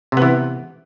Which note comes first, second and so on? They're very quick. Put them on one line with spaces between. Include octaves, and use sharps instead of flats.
C3 B3 E3